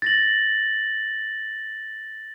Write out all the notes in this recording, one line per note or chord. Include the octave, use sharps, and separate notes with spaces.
A6 A#6 F#7